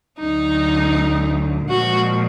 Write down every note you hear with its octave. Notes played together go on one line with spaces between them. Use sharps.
D2 D3 F#3 D#4
A#2 F3 G#3 F#4